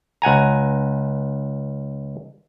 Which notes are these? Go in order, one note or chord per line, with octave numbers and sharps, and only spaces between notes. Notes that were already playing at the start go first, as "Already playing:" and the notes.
C#2 F#5 G#5 A#5